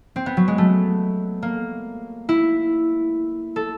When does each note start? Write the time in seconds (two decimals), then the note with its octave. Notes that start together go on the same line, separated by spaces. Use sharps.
0.16 C4
0.26 B3
0.37 F#3
0.48 G#3
0.58 A3
1.42 A#3
2.29 E4
3.56 A4